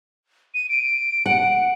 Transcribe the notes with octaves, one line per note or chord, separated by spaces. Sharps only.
D#7
D7
F#5